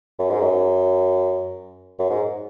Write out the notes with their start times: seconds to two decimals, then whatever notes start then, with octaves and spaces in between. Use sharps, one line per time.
0.19 F#2
0.30 G#2
0.41 F#2
1.99 F#2
2.10 G#2